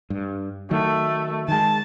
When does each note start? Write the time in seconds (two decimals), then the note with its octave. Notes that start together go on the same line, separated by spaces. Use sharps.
0.10 G2
0.71 D#3 F#3 A3
1.48 D#3 G#3 A5